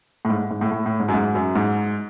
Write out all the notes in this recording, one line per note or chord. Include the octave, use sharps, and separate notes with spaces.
A2
G#2
G#2
A2
A2
A2
G#2
F#2
G#2
F#2
G#2